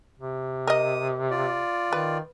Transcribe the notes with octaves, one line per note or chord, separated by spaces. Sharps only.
C3
A#4 D#5 D#6
F4 D5
D#3 B4